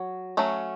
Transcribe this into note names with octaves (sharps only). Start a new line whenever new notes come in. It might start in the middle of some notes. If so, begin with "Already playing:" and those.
Already playing: F#3
F#3 A3 C#4